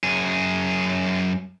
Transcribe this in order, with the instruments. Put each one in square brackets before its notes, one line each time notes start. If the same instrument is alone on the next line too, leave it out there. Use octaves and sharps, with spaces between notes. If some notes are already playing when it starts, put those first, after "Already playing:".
[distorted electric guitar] F#2 G#4